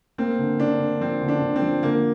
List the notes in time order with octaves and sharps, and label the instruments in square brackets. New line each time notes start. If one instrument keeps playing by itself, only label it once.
[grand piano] A#3 [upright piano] C4
[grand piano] D3
[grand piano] D3 [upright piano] D4
[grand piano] D3
[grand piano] F3 [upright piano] C4
[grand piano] D3
[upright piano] D4
[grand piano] D3
[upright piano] C4
[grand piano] F3
[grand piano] D3 [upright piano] A#3